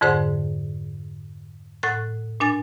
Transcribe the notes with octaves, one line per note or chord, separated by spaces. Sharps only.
F2 G#2 D3 G#4 C5 F#5
A2 F#5 F#6 A6
A#2 D4 G#5 A6